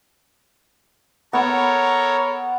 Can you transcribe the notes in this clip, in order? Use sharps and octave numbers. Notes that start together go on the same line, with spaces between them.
B3 A4 A#4 C#5